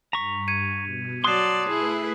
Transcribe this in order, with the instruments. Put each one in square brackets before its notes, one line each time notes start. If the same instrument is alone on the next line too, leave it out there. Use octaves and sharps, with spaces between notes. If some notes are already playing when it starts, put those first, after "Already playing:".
[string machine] G2 [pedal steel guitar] A#5 C#6 [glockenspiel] B6 F7
[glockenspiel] G#6 C#7 D#7
[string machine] B2
[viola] F#3 D5 [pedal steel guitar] A5 C6 [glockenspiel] D#6 F#6 C7 [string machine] A6
[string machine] A3 B4 E5 [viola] E4 G#4